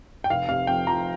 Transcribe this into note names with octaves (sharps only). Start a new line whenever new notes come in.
G5
F1 F5
C3 F5
F2 G5
F3 A#5